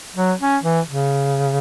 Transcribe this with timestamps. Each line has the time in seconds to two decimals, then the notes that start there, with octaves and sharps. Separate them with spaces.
0.16 F#3
0.40 C#4
0.63 E3
0.87 C#3